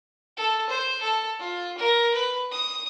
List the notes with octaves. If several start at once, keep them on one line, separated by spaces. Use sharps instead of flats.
A4
C5
A4
F4
A#4
B4
D#6